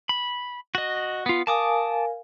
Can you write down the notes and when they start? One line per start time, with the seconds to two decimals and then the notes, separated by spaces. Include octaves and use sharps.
0.09 B5
0.75 F#4 D#5
1.26 B3 F4
1.47 A#4 F5 G#5 A5 D6 D#6